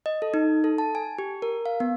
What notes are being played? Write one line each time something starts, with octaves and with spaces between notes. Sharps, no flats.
D#5
A4
D#4
A4
A5
G#5
G4
A#4
F5
B3